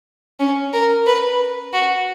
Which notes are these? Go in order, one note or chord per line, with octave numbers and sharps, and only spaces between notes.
C#4
A#4
B4
F#4